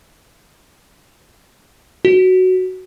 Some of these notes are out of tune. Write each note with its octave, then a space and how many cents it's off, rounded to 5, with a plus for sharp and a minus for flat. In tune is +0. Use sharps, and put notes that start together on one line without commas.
F#4 +5